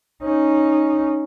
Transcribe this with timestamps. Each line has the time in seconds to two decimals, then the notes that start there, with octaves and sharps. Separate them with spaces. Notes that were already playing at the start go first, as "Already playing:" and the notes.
0.23 C#4 D#4